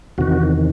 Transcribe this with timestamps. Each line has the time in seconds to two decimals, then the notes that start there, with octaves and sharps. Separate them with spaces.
0.18 E2 C3 D#3 F#4